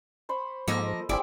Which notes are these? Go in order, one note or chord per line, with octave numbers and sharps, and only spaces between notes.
C5 B5 C#6
G#2 F3 A#3 A4 D#5
G1 C4 E4 G4 G#4 D5